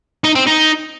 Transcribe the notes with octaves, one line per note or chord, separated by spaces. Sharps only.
D#4
C4
D#4